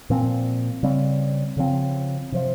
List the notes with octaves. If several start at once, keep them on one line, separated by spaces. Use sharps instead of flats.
A#2 F3 C4
C#3 G3 C4
C#3 F3 C4
C3 F3